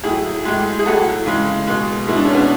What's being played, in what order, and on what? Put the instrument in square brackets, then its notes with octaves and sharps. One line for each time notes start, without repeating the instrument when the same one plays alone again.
[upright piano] A2 F#3 E4 G#4
A2 G#3
G#4
A2 F#3 F#4 A4
C#3 E3 G#3
B2 G#3
B2 G#3 E4
D4
C#4
B3 D4